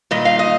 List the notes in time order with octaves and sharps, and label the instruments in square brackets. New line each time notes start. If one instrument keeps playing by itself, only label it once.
[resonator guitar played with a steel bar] A#2 G3 D#5
F5
D#5